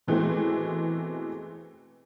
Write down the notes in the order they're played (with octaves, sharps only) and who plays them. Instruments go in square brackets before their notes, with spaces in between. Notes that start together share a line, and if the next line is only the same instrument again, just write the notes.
[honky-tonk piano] B2 E3 G#3 A3 C4